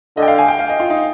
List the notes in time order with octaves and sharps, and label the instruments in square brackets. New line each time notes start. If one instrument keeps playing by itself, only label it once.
[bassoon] D3 [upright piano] D#5
[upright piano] G5
F5
G#5
G5
F5
D#5
F4
D#4